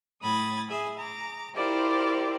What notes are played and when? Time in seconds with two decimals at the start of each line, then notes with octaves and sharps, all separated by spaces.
0.21 A2 B5 D#6 G#6 A6
0.69 G#4 E5 D#6
0.98 A#5 D6
1.55 E4 F4 G4 A#4 C5 D5